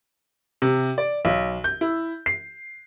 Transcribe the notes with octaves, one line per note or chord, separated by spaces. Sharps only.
C3
D5
B1
G6
E4
C7